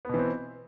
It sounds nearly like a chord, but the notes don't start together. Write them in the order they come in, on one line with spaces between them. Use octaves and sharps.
B3 B2 E3 C4